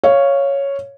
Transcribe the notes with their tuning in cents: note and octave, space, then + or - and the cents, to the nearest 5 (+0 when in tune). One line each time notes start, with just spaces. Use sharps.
C#5 +0 F5 -10